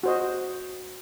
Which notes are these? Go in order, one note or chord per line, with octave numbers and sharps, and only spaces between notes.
F#4 C5 D#5